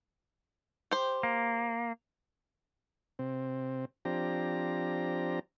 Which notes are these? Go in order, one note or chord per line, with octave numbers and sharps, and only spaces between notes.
G4 C5
A#3
C3 C4
F3 C4 D4 G4 A#5